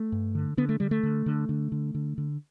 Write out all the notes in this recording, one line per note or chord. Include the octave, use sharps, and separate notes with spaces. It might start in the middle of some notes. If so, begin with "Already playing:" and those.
Already playing: A3
G2
D3
D3 B3
A3
D3 G3
A3
D3
D3
D3
D3
D3
D3